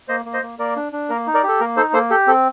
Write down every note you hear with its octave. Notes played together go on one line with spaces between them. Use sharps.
A#3 C5 D#5
A#3
C5 D#5
A#3
A#3 A#4 D5
D4
D4
A#3 A#4
D#4
A#4 D5
G4 A4
A#3 A#4
D#4 A4 C5
A#3 A4 C5
G4 A4
C4 A4